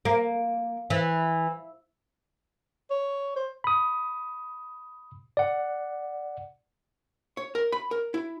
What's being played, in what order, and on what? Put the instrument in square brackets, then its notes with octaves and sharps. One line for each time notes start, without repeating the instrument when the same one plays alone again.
[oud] A#3
E3
[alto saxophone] C#5
C5
[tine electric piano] B5 D#6
D5 F#5
[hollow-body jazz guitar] C#5
A#4
B5
A#4
E4